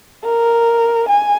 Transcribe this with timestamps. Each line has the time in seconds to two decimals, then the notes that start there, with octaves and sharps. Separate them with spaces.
0.24 A#4
1.09 G#5